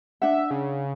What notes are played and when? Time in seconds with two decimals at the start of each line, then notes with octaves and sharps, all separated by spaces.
0.22 D4 E5 F#5
0.51 C#3